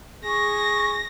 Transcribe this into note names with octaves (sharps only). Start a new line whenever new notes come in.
G#4 C#6 A#6